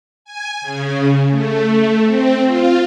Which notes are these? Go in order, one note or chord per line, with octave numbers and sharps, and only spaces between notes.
G#5
C#3
A3
C4
F4